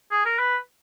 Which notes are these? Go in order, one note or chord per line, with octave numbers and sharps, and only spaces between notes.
G#4
A#4
B4